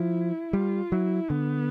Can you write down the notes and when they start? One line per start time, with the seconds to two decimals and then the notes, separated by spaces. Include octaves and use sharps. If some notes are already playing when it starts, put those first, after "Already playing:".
Already playing: F3 E4
0.53 G3 F4
0.92 F#3 E4
1.30 D3 B3